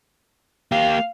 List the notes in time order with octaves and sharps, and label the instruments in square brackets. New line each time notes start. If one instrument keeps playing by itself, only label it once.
[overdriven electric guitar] A#3 G4 [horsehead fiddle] F5